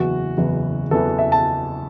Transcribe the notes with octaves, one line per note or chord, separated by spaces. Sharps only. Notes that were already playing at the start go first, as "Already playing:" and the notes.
Already playing: F#1 E2 E3 F#4
F#1 E2 E3
F#1 E2 E3 A4
E5
A5